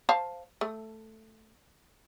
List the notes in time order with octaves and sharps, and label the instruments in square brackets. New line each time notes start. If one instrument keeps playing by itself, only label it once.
[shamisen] C5 F5 A5
A3